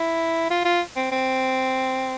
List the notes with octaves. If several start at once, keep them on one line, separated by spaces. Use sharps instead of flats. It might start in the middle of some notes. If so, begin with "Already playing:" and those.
Already playing: E4
F4
F4
C4
C4